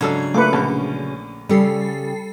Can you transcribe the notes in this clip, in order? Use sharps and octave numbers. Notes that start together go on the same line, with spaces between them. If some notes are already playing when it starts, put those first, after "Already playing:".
G#2 C#3 F#3 D4 A4 E6 G#6
A3 A#3 F4 B4 D6 C#7
A#1 D3 C#4 A5
C#3 G3 G4 A4 C7